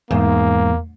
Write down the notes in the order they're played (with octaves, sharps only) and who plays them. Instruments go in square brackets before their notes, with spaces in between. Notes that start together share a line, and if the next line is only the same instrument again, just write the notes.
[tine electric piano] E2 [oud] G#2 [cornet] A#3